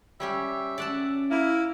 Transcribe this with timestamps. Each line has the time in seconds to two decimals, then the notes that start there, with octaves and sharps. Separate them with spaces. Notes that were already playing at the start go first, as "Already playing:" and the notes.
0.20 G3 C#4 G4 E5
0.78 C#4 D5 F#5 A5
1.31 A#3 E4